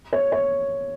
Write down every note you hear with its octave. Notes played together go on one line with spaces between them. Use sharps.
C#5
C#5